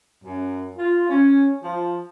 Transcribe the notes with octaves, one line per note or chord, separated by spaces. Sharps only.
F#2
F4
C#4
F3